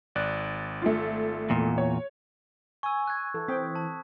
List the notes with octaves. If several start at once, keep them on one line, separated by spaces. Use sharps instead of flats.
G#1 D5 F#6
A3 F4
E2 A#2
C#5
G#5 C#6 E6
F#6 G#6
E3 A4
C4 G5 D#6 B6
A5